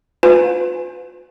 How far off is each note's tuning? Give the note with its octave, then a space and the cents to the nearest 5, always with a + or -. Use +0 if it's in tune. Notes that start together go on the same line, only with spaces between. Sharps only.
F4 +40 B4 +35 G#5 +0